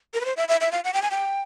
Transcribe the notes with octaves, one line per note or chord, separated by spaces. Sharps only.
A#4
B4
C5
E5
E5
E5
F5
F#5
G5
G#5
G5